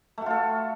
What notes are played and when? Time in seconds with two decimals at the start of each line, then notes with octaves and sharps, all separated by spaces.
0.18 A3
0.22 F#4
0.26 F4
0.31 A4